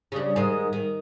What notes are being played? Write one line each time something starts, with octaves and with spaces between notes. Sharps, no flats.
C#3 G3 D4
G#2 D#3 G#3
D#3